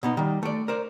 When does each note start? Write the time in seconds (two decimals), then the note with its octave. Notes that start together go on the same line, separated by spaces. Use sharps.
0.03 B2 B3 D#4
0.17 D#3 G3
0.43 A3 D5
0.68 A#4 C5 D5